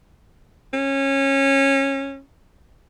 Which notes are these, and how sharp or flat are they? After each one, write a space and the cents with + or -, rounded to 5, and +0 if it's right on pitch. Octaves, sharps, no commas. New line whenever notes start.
C#4 -20